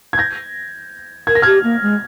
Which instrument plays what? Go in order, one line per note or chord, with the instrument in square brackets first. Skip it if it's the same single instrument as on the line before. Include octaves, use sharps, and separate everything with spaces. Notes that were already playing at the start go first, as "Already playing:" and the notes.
[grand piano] G#6
G6 A#6
[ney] A#4 [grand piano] G#6
[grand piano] A#6
[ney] G4 [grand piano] F6 G#6
[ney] A#3
G#3